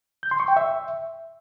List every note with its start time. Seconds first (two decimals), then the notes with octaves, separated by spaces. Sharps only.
0.23 G6
0.31 C6
0.40 C#6
0.48 G5
0.56 E5